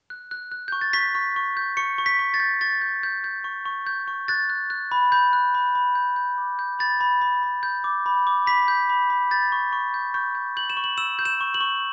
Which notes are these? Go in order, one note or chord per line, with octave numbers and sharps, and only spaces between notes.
F#6
F#6
F#6
C#6 G6
A6
C#6 B6
C#6
C#6
G6
C#6 C#7
C#6
B6
C#6
A6
G6
C#6 A6
G6
G6
G6
C#6
C#6
G6
C#6
F#6 A6
F#6
F#6
B5
B5 G6
F#6
B5
B5
G6
G6
D6
G6
B5 A6
B5
B5
B5
G6
D6
B5
D6
B5 B6
G6
B5
B5
G6 A6
C#6
C#6
G6
C#6 G6
G6
G6 F#7
E7
C#6
F#7
E6 E7
G6
E7
C#6
F#7
C#6